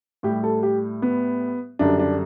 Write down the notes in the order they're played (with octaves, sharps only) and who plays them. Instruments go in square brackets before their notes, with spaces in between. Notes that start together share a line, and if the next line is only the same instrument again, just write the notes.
[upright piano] A2 G3 G4
A4
G4
B3
F#2 D3 G3 D4
D4